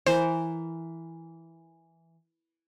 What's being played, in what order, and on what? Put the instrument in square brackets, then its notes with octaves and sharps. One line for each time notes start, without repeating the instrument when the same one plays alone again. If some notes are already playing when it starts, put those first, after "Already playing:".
[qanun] E3 A#4 [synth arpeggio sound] C5